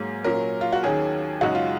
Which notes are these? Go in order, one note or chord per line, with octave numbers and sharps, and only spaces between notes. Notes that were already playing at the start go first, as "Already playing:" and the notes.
Already playing: G#2 F#3 A#3 G#4
A#2 F#3 C#4 A#4
F4
F#4
D#2 D#3 F#3 C#4 G#4
F#2 C#3 G#3 D#4 F#4
F4